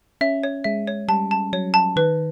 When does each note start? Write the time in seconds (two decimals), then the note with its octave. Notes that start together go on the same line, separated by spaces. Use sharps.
0.21 C#4 E5
0.43 C#5
0.64 G#3 E5
0.87 C#5
1.08 G3 A5
1.31 A5
1.53 F#3 C#5
1.74 A5
1.96 D#3 B4